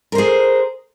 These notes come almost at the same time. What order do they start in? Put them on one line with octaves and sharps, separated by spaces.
A#4 C5 G#4